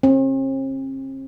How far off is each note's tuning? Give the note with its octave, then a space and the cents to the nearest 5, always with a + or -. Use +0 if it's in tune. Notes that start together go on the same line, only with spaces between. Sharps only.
C4 +45